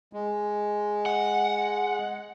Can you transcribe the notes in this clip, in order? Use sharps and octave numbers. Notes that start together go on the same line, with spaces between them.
G#3
F#5